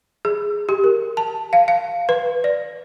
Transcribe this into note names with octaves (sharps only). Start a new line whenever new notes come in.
G#4
G4
A#4
A5
F5
F5
B4
D5